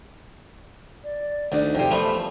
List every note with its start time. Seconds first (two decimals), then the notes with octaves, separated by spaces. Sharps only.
1.04 D5
1.52 D2 D#3 D4 D#4
1.75 F2 C3
1.91 E2 F3 G3 A3 B5